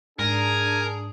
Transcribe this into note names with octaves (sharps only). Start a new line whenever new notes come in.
G#2 D4 G#4 A#4 G#5